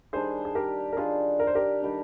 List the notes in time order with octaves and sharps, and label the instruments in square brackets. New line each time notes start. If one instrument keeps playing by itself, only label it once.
[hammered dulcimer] D#3 G3 D4 [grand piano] G#4 C5
[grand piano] G#4
G4 A#4
A#4
[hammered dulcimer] D#3 G3 D4 [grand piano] F4 G#4
[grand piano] A#4
C5
G4 A#4
[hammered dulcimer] D#3 G3 D4